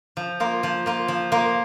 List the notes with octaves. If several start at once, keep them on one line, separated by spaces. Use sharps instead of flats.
F3
A#3 F4
F3
A#3 F4
F3
A#3 F4